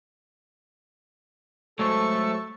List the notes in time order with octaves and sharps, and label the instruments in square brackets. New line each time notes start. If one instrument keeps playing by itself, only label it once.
[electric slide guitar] F#3 G#3 C5 [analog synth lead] A3 [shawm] A4 [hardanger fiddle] C#6